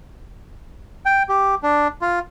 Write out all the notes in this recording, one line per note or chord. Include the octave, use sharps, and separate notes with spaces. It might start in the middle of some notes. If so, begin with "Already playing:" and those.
G5
G4
D4
F4